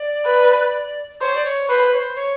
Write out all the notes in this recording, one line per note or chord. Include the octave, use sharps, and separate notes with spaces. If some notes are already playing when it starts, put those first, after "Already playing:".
Already playing: D5
B4
C5 C#5
D5
C#5
B4 C5
C#5
C5
C#5